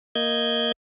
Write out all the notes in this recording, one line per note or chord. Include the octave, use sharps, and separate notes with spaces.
A#3 D#5 G6 G#6